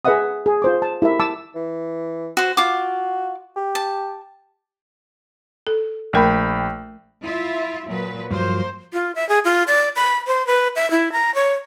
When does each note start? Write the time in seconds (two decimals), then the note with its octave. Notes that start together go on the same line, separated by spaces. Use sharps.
0.05 G#4 B4 D#5 E5 F#5 D#6
0.46 G#4
0.62 F4 C5 D6
0.82 A5
1.02 E4 G4 A#4 E5
1.19 A5 D6 E6
1.55 E3
2.37 F#4 C5
2.57 F4 F#4 D6
3.56 G4
3.75 A5
5.67 A4
6.13 A#1 A3 A#4 G5 B5
7.24 E4 F4 E5
7.86 A#2 F#3 B4
8.31 G2 F3 F#3 A#3 C5
8.93 F4
9.15 E5
9.29 G#4
9.45 F4
9.67 D5
9.96 B5
10.27 C5
10.47 B4
10.76 E5
10.91 E4
11.12 A#5
11.35 C#5